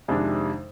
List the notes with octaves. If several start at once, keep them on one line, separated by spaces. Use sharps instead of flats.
F2 C3 D#3 G#3 D4